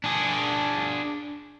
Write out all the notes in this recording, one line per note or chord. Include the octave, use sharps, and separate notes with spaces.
D4 G#4